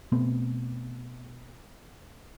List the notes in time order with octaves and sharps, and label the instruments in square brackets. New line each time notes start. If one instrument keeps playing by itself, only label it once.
[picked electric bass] B2 A3 B3 C4